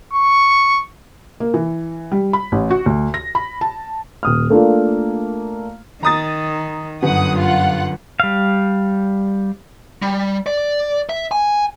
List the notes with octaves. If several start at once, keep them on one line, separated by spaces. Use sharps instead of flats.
C#6
A#3
E3
G3
B5
A1
F#4
D2
A#6
B5
A5
D#1 D#6 F6
A3 A#3 D4 F4
D#3 A#5 D#6 A6
G1 F#2 F#5 D#6
F4 F#5
G3 F5
G3
D5
E5
G#5